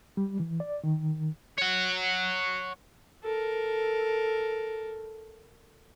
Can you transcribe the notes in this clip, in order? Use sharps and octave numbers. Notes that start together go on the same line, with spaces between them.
G3
E3
D5
D#3
C#5 F#5
A4 A#4